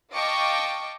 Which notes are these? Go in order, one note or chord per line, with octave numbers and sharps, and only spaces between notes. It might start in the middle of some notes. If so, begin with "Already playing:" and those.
D#5 F5 G5 A5 C#6 D6